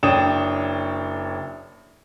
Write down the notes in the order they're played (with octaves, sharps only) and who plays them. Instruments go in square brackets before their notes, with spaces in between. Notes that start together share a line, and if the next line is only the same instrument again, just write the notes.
[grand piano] F#1 D4 C#5 G5 D#6 E7